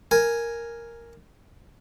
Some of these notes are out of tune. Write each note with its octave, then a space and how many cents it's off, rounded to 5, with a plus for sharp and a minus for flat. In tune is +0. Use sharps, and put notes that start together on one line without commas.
A#4 +0 G#5 +0